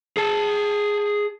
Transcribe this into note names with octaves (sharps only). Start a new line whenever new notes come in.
G#4 A5